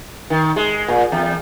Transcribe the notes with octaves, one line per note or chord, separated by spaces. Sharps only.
D#3
G#3
A#2
E2